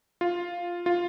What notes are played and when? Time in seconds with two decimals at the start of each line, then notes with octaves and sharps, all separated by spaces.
0.21 F4
0.86 F4